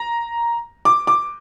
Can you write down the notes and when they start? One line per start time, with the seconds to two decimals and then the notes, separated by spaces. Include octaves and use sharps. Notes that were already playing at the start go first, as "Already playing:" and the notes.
Already playing: A#5
0.85 D6
1.07 D6